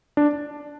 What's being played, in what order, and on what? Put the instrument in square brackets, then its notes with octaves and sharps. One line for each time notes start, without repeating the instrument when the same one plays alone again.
[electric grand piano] D4